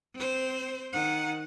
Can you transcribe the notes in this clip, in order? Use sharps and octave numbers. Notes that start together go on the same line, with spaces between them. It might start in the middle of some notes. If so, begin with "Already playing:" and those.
C4 C5
D#3 F#5